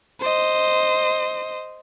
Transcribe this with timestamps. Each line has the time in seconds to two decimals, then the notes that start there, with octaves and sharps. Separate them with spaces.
0.21 C5 D#5